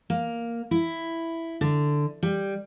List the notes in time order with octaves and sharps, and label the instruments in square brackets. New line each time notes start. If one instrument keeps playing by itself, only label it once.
[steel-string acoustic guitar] A#3
E4
D3
G3